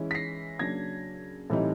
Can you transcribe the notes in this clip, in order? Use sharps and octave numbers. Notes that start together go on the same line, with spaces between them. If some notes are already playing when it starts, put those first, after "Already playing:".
Already playing: E3 G#3 C#4 E4
B6
A#6 C7
C#3 F#3 A#3 D4 G#6 A#6
A2 E3 G3 C4 D#4